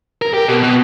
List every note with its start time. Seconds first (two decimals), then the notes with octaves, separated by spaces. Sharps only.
0.22 A#4
0.34 G4
0.48 B2
0.63 B2